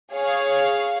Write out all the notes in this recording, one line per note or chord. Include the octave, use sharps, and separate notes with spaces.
G#4 C#5 F5